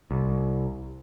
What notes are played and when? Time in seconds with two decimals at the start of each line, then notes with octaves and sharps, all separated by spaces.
0.11 C2